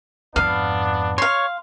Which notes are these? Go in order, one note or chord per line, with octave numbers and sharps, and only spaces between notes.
F2 G#2 B3 D4 F5
C#5 F5 C6